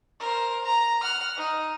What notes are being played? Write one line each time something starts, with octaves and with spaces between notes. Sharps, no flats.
A#4 C5
A#5
F#5 F6
D#4